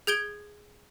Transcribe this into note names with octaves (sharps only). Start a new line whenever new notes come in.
G#4 G6 G#6 D7 G7